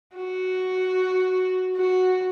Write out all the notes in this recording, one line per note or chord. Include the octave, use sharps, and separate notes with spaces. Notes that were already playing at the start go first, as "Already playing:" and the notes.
F#4
F#4